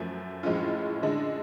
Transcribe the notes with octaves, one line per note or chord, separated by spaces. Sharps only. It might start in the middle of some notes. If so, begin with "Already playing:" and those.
Already playing: F#2 F3 A3
A2 F3 G#3 C#4 F4
D3 G#3 D4